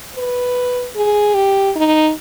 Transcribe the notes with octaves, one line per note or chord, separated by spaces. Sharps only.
B4
G#4
G4
D#4